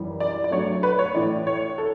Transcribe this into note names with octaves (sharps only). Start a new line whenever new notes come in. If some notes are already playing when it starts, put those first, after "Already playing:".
Already playing: F#2 E3 G3
D5
D5
G2 F#3 A3 C#5
B4
C#5
A2 E3 A3 D5
C#5
A4